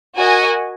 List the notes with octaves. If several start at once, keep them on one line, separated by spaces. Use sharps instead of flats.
F#4 A#4 D#5 G#5